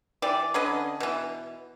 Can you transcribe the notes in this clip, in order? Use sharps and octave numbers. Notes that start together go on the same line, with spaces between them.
E3 G4 D5
D3 C#4 B4 D#5
B2 E3